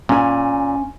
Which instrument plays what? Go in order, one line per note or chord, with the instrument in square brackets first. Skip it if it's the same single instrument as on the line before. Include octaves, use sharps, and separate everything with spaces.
[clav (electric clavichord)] A#2 [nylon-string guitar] C#4 G#5